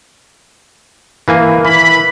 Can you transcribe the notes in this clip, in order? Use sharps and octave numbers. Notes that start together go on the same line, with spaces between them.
E3 A#3 G#5
E3 B5